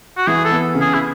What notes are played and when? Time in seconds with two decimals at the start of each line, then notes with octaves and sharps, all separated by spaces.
0.17 F#4
0.27 E3 G#4
0.45 A4
0.51 B3
0.75 C#3
0.81 G#4
0.94 E4